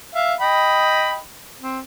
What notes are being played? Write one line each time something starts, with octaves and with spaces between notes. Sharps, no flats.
E5 F5
D#5 G5 B5
C4